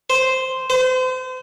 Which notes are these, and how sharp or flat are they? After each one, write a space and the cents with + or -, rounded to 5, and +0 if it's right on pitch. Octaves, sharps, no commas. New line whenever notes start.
C5 -5
C5 -35